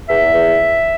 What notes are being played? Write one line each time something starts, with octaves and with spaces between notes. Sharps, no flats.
E2 E5
E2